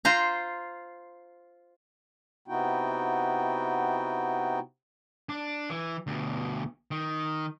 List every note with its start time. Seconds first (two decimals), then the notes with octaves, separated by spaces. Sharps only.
0.05 F4 C5 A#5
2.48 C3 B3 D#4 E4 F#4 G5
5.29 D4
5.70 E3
6.07 D2 B2
6.91 D#3